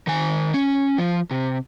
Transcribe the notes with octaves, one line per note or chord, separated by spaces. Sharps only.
D#3 G#5
C#4
F3
C3